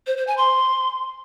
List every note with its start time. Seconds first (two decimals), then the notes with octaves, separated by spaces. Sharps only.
0.07 C5
0.17 C5
0.27 G#5
0.38 C6